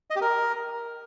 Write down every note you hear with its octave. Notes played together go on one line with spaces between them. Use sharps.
D#5
G4
A#4